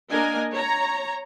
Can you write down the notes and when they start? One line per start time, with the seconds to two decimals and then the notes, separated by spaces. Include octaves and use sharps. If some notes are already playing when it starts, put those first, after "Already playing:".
0.10 A#3 D4 A#4 D#5 G#5
0.53 C#5 A#5